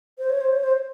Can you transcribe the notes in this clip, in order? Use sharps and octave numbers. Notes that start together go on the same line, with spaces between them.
C5
C#5
C5
C#5
C5